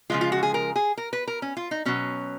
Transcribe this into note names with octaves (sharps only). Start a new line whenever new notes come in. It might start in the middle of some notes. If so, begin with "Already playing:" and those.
C#3 F3 G#3 F4
F4
F#4
G#4
A#4
G#4
A#4
B4
A#4
C#4
F4
D#4
B2 F#3 C#4